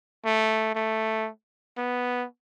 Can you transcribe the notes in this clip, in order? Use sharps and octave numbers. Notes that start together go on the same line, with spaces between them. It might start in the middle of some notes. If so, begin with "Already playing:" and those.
A3
A3
B3